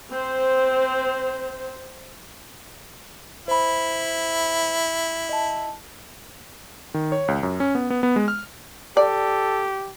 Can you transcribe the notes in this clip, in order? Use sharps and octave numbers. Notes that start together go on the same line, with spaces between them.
C4 C5
E4 C5 B5
D#5 A5
D#3
C#5
C#2
F#2
C#4
B3
B3
B3
G#3
F6
G4 A4 D5